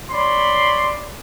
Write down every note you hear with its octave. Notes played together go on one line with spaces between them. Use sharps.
C#5 D5 B5 C6